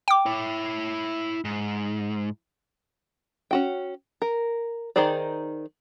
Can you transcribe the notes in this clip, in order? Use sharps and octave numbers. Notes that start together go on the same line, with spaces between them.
G5 D6
E4 C#5
G#2
C#4 F#4 G5
A#4
D#3 D#4 G#4 C5 D5